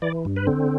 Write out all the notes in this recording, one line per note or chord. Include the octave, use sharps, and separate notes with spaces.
E3 D5
G2
B4
D3 C4